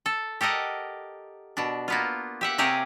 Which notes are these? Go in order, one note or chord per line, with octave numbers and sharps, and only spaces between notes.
A4
G4 A4 A#4 D#5 F#5
B2 D4
A#3 B3 F4
G4 E5 F#5
C3 G4 G#4 A#4 C#5